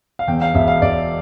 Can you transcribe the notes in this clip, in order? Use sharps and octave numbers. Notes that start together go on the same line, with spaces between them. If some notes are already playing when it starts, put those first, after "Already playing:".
F5
E2 G5
F5
E1 E5
F5
E1 D5